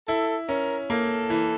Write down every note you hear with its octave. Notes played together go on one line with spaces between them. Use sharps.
E4 A4
C#4 A#4
A#3 A4
E3